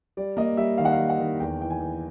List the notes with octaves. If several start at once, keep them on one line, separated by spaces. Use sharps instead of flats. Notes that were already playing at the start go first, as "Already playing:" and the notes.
G3 D5
A#3 D#5
G3 E5
D#3 F5
F#5
F5
G3
F#5
D#3
E2 G5
E3 G5
G#5
E3